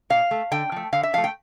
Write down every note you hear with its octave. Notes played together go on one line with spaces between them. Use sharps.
A#2 F5
A3
D3 G5
F3 A3
D3 F5
E5
F3 A3 F5
G5